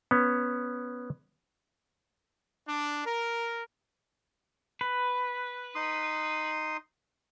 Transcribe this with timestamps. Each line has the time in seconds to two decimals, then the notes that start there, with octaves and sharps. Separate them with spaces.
0.11 B3 C#4
2.68 D4
3.05 A#4
4.81 B4
5.75 D#4 C6 D#6